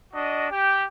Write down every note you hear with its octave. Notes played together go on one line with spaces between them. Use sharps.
D4 F#4 D#5
G4 G5